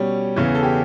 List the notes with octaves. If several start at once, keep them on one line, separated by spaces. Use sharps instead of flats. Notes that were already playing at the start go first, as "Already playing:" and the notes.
Already playing: B2 G3 C#4
E2 C#3 E3
A4
G4